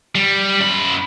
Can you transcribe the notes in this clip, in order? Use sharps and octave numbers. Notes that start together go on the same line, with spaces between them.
G3
F#2 B5